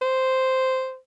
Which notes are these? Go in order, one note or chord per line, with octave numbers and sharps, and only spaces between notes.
C5